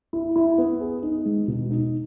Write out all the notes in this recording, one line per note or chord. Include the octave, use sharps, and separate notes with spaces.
E4
E4
B3
G#4
D#4
G#3
B2
D#4